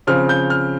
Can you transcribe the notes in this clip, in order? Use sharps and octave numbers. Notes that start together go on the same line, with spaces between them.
C#3 F3 C4 F6
G6
F6